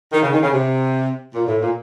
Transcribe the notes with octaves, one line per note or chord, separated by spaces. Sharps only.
D#3
C#3
D#3
C#3
C3
A#2
A2
A#2